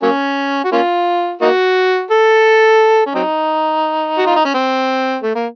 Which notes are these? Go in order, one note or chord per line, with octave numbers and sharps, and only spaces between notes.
F#3 A#3 C#4
F#4
A#3 C#4 F4
A#3 D#4 F#4
A4
C#4
F#3 C4 D#4
F#4
F4
D#4
C#4
C4
A3
A#3